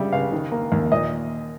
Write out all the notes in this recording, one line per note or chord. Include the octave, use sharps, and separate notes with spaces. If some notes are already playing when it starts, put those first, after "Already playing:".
Already playing: C#3 G3 E5
C#2 F5
D#3
A#3
D#2
A#2 D#5